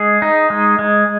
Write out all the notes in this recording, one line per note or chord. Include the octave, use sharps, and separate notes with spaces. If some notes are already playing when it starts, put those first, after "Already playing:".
Already playing: G#3 G#4
D#4
G#3
G#3